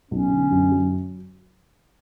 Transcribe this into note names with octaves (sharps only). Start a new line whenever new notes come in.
B1 C#4
D3
F#2
F#3